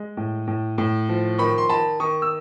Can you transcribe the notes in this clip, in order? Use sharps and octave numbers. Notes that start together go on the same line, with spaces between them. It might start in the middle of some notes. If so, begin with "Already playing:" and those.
Already playing: G#3
A2
A2
A2
F3
D#3 B5 C#6
C6
D#3 A5 B5
D#3 C#6 D#6
E6